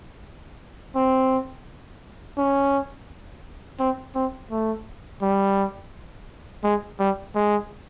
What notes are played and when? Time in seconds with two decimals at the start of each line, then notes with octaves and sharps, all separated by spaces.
0.95 C4
2.37 C#4
3.79 C4
4.15 C4
4.51 A3
5.22 G3
6.63 G#3
6.99 G3
7.35 G#3